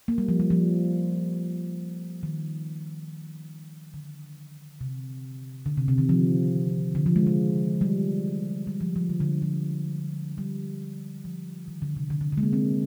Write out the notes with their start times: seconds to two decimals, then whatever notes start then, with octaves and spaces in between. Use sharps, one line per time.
0.08 A#3
0.18 G3
0.29 F3
0.40 G3
0.50 F3
2.23 D#3
3.94 D3
4.81 C3
5.66 D3
5.77 C3
5.88 C3
5.98 D#3
6.09 F3
6.95 D3
7.06 F3
7.16 G#3
7.27 G#3
7.81 G3
8.67 G3
8.81 F3
8.96 F3
9.09 D3
9.20 D3
9.42 F3
10.38 G3
11.25 F3
11.68 D#3
11.82 D3
11.96 C3
12.10 D3
12.21 D3
12.32 D3
12.38 G#3
12.43 A#3
12.53 C4